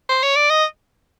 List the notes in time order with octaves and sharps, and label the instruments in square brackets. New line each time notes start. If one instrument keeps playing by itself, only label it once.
[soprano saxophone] C5
C#5
D5
D#5